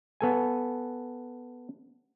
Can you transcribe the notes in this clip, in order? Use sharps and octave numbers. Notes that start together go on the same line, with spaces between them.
B3 A4 G#5